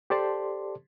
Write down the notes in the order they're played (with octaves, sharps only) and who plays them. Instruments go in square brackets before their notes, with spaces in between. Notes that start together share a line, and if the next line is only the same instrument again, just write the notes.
[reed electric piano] G4 A4 C5 D5 A5 C6